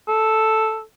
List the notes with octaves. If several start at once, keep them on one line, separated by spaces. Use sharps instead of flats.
A4